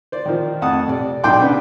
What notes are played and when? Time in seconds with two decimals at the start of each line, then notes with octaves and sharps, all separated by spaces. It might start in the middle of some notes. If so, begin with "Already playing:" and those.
0.12 C5 D5
0.26 D#3 F3
0.62 F2 A3 F#5 A5 D#6
0.88 C3 D5
1.24 B1 D4 G5 C6 D6
1.42 G2 C#3 B3